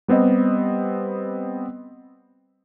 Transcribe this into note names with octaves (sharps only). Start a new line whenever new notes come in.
G3 B3 C4 G4 D#5